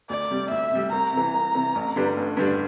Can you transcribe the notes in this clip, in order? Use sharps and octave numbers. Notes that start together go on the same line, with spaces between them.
D2 D5
C3 G3
D2 E5
C3 G3
C2 A#5
C3 E3
C2
C3 E3
A1
G2 D3 G3 D4
A1
G2 D3 G3 D4